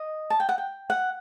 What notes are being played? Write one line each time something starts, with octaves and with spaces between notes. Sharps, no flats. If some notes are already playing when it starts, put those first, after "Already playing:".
Already playing: D#5
A5
G5
F#5
G5
F#5